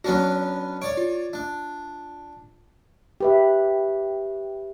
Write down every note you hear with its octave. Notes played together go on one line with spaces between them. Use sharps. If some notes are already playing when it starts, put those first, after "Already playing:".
F#3 B3 C#4 D4 F#4
C#5 D5 D7
F4
D4
G4 B4 E5